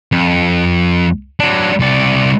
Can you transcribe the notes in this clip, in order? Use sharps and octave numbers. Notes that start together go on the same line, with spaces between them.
F2
F#3 D4
C2 D5